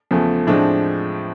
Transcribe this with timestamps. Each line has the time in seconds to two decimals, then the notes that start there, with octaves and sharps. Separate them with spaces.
0.11 E2 C#3 F3 A3
0.47 A2 F3 G#3 C4 D4